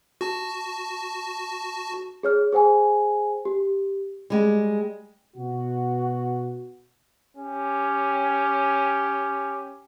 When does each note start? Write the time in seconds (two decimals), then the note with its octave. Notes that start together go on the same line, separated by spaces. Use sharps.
0.21 F#4 A5
2.23 G#4 C#5 F6
2.52 G#4 C5 G5 G#5
3.45 G4
4.30 G3 G#3
5.36 B2 F#4
7.37 C#4 G4